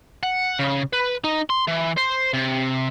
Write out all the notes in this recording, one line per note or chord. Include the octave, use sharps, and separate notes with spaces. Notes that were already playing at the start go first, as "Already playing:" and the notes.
F#5
C#3
B4
D#4
C6
E3
C5
C3